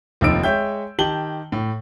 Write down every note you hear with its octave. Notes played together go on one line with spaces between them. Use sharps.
F1 D#2 F3 D#4 E6 D7
G#3 C#5 E5 G5 G6
D#3 G4 A5 F#7 G7
A2